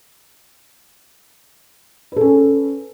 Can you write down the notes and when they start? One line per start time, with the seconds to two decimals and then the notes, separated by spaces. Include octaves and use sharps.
2.12 B4
2.16 A4
2.21 C#4